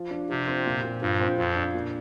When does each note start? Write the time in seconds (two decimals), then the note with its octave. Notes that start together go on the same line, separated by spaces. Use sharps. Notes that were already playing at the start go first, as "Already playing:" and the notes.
Already playing: F3
0.11 D4
0.30 C3 F3
0.48 C4
0.66 A#2
0.84 A#2
1.02 G2 F3
1.19 C4
1.38 F2 F3
1.56 D4
1.74 A#2